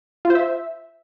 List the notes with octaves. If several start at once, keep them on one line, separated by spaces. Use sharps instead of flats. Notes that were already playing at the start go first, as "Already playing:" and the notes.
F4
C5
E5